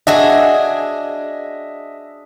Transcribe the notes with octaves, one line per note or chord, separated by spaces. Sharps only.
D4 F#4 G#4 D#5 E5